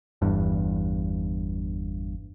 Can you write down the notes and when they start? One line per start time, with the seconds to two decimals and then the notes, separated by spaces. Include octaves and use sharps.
0.22 G1 E2 G2